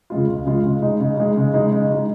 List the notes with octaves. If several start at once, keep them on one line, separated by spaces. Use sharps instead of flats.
C#3 G#3 F4
C#2
C#3 G#3 F4
C#3
G#3 D#4
C#3
G#3 D#4
C#3
G#3 D#4
C#3
G#3 D#4